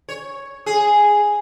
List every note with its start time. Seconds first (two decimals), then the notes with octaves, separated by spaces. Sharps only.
0.09 C#5
0.66 G#4